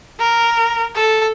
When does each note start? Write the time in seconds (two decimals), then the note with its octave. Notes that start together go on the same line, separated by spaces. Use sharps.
0.20 A#4
0.95 A4